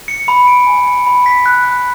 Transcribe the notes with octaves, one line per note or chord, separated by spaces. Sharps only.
C#7
B5
D7
G#5
C#7
B5
B6
F#6
F#6